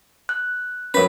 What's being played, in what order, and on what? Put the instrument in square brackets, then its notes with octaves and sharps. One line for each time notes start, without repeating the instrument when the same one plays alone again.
[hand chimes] F#6
[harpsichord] F#2 B4 [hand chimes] C#4 B6